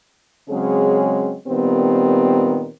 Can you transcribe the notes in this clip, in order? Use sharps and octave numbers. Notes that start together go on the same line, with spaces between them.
C#3 F#3 G#3 C4 C#4 G#4
A#2 D#3 G3 B3 C4 G4